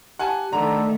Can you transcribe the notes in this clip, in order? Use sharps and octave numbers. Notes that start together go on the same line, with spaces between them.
G4 F#5 G#5 A5
D3 D#3 A3 A4 A#5